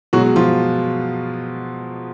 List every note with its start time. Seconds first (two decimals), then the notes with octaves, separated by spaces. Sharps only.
0.13 B2 F#3 G#3 F#4
0.36 F3 F4